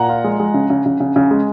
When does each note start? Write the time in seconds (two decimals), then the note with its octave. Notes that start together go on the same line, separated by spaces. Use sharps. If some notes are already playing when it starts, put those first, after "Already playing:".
Already playing: A#2 F#5 A#5
0.09 F4
0.24 G#3
0.40 G#3
0.54 C#3
0.70 C#3
0.86 C#3
1.00 C#3
1.16 C#3
1.31 G#3